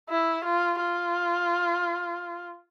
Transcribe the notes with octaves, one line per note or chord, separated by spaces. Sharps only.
E4
F4
F4